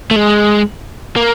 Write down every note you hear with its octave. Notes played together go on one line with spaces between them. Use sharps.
A3
G#3
A#3